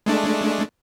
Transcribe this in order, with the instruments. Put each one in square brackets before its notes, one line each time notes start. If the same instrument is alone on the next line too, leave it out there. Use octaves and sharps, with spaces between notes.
[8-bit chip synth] G#3 A3 D4